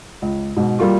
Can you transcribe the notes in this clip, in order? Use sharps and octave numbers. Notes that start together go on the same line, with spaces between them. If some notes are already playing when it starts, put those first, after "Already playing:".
C#2
G#2 B2
G3 A#3 F4 F#4